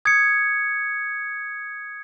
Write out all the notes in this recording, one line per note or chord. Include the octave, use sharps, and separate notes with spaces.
D#6 G#6 C#7